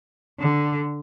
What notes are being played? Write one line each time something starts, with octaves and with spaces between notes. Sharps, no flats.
D3